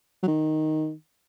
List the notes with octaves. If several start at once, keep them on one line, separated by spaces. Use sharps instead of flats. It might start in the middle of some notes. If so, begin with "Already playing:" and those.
F#3
D#3